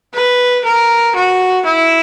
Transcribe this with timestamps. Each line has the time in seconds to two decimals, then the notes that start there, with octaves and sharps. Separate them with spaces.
0.14 B4
0.64 A#4
1.15 F#4
1.65 E4